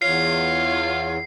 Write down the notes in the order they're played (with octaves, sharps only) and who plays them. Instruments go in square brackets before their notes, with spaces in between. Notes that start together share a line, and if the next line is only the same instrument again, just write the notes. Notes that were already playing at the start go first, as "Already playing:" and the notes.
[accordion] E2 [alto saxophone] F4 [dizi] C#5 [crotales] C7